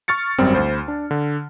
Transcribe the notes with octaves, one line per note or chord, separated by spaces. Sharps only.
C#6 F6 A6 C#7
G#1 F#2 G3 C4
D2 C5 B5
D4
D3